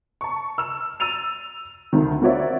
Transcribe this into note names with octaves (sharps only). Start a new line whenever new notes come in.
A5 C#6
E6 F6 E7
E6 A6 D#7 F7
D2 D#3
A#3 C4 F#4 C#5 D5 E5